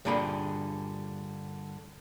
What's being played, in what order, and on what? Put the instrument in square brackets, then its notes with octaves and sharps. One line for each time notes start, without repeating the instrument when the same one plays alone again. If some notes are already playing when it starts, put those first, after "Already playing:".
[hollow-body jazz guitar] G2 A#2 D3 G#4 B5